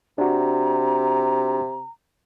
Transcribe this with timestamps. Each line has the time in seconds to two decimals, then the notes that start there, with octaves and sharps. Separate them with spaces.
0.18 C3 D4 F#4 A#5